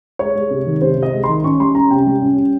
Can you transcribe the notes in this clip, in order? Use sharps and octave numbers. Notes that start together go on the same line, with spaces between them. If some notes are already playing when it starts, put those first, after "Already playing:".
G#3 C#5
G#3
C3
D#3
C3 C5
C3
D#5
G#3
D#3 C6
C#4 C#6
G3 C6
C#4 A#5
C3 G5
G3
C#4
C#4